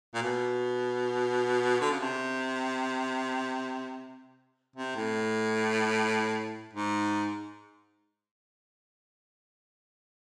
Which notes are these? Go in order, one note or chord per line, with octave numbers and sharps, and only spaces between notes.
A#2
B2
D3
C#3
C3
C3
A2
G#2